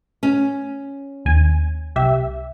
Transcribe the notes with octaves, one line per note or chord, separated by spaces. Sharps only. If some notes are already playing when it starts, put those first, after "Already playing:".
C#4
D#2 G#5
C2 G4 E5